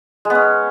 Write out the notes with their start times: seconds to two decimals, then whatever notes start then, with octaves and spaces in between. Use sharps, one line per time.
0.25 G#3
0.30 B3
0.35 C#4